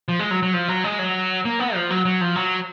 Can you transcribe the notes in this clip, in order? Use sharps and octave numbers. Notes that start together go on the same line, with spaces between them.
F3
G#3
F#3
F#3
F3
F#3
G#3
F#3
A#3
B3
F3
F#3
F#3
F3
F#3